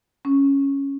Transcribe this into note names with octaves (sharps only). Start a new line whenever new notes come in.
C#4